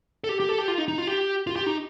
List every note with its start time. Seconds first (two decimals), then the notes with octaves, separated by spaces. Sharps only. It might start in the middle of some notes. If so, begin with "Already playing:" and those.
0.24 A4
0.29 G4
0.40 G4
0.49 A4
0.58 G4
0.68 F4
0.78 D#4
0.88 D#4
0.98 F4
1.07 G4
1.47 F4
1.56 G4
1.66 D#4